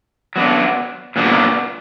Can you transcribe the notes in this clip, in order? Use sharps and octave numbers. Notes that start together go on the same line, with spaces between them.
F#3 B3 D4
A#2 F#3 B3 D4